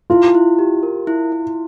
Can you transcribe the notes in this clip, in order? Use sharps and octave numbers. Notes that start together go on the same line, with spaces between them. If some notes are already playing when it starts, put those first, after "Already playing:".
E4 F4
E4
G4
A#4
E4
E4